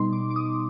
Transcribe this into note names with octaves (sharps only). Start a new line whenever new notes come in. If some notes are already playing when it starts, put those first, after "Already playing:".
Already playing: B2 G3 B3 D#4 C6
D6
D6
D#6